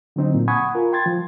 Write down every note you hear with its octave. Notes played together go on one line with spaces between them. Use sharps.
D3 F#3 C4 D#4
A#2
F#5 G#5 B5 C#6 D#6 G#6
F4 A#4
G5 C6 G#6 A6
F3